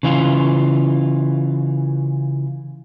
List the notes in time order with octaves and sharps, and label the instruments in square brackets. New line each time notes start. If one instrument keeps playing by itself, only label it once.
[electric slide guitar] C#3 E3 F4